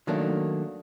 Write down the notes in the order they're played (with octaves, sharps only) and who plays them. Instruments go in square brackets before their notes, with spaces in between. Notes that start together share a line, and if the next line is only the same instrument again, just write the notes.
[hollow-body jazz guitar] D#3 F#3 A3 A#3 D4